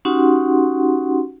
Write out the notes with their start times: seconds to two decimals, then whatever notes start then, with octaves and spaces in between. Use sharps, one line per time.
0.05 C#4 D#4 F#4 G4 F#5 C6